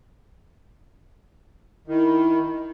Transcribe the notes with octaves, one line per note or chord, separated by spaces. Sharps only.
D#3 E4